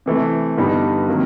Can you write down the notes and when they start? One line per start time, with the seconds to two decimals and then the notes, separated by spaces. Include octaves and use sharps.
0.06 C3 E3 A3
0.57 G2 D3 G3 B3 D#4
1.08 C3 D#3 F#3 A#3